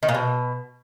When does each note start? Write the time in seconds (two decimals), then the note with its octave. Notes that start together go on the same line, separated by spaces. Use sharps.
0.03 D#3
0.09 A#2
0.15 B2